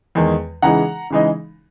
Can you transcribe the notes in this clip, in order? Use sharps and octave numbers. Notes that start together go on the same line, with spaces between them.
E2 D#3 G#3
C#3 E3 G#3 D#4 F#5 A#5
C#3 E3 G#3 D#4